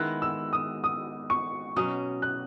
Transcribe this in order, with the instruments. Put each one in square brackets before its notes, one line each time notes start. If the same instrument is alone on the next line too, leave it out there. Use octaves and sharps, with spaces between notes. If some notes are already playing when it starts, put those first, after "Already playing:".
Already playing: [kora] D#3 G#3 B3 E4 [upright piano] F#6
[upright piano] E6
D#6
D#6
C#6
[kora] B2 F#3 C#4 [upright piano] D#6
[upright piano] F#6